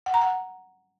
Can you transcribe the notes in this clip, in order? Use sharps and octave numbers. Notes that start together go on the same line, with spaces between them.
F#5
A#5
F#5